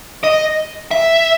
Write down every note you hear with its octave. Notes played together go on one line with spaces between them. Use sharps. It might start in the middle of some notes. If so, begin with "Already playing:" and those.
D#5
E5